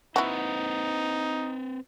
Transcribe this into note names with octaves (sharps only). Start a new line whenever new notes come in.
C4 D#4 E4 F#4 B4 C5